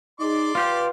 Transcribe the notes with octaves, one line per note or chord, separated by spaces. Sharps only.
D#4 G#4 D5 C6 D6
F4 G4 B4